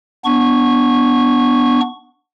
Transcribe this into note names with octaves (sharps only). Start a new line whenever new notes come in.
B3 D4 C#6